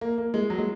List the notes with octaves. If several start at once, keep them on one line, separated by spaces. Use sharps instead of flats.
A#3
A#3
G#3
F#3
G#3